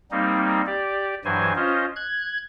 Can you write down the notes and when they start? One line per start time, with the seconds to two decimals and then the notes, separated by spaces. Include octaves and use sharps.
0.11 G3 A#3 C4 D#4
0.67 G4 D5
1.25 G2 E3 F#3 C5 G#5
1.56 C#4 F4 C5 D#5
1.96 F#6 G#6